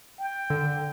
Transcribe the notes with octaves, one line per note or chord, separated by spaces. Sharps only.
G5
D3